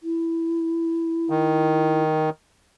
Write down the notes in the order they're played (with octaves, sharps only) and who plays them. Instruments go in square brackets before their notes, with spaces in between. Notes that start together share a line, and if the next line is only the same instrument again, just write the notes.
[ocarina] E4
[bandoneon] D#3